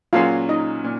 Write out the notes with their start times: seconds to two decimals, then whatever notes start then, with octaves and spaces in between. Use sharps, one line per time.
0.13 A#2 F#3 A#3 C#4 F4 G#4 F5
0.49 D#4 D#5
0.84 A#2